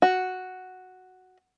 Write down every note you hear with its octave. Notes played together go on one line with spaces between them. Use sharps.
F#4